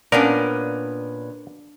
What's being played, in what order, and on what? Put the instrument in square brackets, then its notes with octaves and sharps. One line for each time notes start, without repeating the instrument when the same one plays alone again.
[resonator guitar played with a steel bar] A#2 B3 C#4 [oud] D4 [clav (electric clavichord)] A#4